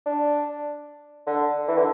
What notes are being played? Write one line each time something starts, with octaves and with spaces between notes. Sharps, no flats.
D4
D3
E3
D3